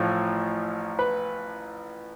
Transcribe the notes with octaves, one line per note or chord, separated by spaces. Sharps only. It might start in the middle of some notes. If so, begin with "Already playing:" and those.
Already playing: A1 A2 F3
B4